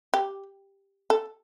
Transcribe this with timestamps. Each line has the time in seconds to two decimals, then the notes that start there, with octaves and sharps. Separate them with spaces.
0.14 G4
1.10 A4